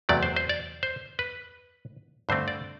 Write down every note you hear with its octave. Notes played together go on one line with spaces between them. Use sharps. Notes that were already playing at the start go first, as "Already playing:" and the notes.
E2 C3 F#3 A3 D5
C5
C5
D5
C5
B4
G2 D3 A3 C4 C5
D5